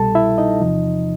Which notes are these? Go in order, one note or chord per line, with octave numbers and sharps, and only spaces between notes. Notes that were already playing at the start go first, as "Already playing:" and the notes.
Already playing: C2 B2 G3 A4 A5
E4 E5
D#4 D#5
E2 C3 F3